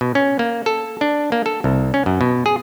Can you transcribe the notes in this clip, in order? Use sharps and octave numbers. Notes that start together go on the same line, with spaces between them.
B2
C#4
A#3
A4
D4
A#3
A4
C2
C#4
F#2
B2
G#4